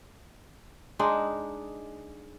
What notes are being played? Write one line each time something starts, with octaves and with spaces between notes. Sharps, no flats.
G#3 D4 D#4